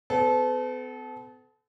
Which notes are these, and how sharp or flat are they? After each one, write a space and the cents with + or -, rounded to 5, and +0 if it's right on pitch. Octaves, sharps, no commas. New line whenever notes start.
B3 +45 A4 -25